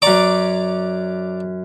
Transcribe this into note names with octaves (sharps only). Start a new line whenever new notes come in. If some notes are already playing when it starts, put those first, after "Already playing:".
F#2 D5 A#5 C#6 D6